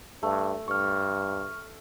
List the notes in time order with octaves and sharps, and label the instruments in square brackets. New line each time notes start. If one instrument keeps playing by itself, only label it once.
[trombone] G2 [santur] A3
[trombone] G2 [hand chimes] C#6 F6